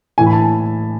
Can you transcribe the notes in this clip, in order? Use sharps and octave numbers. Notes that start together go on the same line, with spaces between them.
A2 E3 G#5
B5
A5